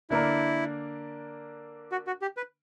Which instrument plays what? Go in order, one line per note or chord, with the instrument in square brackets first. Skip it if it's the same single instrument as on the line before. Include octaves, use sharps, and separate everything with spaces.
[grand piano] D3 A#3 D4 A#4 [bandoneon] E4
[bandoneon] F#4
F#4
G4
B4